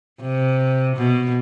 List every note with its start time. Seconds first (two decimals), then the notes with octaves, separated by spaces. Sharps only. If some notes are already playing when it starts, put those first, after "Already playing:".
0.21 C3
0.96 B2